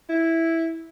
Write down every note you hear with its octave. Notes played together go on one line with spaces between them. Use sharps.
E4